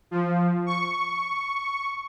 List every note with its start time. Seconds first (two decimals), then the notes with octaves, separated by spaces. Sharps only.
0.11 F3
0.66 C#6